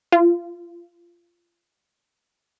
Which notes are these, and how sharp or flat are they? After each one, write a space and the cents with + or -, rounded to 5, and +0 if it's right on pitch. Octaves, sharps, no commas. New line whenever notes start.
F4 -20